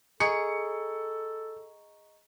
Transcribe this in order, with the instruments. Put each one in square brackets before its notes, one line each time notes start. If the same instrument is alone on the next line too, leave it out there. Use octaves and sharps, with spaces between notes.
[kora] G#4 [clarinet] A4 [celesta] D#5 A#5 C#6 [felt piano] C#7